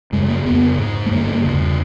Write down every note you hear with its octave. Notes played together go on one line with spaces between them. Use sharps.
F#2 C#3 G#3
A#3
F2 C#3 B3
G#2
A3
G2 D3 A#3
E2 C#3